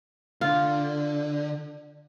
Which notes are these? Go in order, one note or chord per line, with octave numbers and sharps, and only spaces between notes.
D3 F4